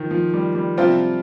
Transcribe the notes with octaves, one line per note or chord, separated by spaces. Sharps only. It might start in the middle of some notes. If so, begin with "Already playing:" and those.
Already playing: D#3 F3
F3
G3
G3
C3 F3 G3 C4 F4